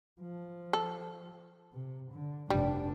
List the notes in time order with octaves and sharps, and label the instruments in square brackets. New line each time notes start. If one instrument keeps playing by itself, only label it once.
[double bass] F3
[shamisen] A4
[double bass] C3
D3
[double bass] F1 D4 [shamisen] G3